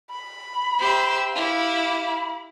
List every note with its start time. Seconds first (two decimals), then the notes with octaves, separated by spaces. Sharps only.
0.11 B5
0.79 G4 C5 E5
1.35 E4 G4 F5
1.73 B5